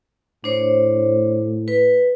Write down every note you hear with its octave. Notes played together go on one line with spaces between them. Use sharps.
A2 D4 C5 C#5
B4